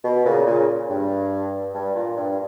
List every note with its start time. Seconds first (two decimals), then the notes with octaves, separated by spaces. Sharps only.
0.03 B2
0.24 A#2 C#3
0.46 A#2 C#3
0.89 G2
1.74 G2
1.95 A#2
2.17 G2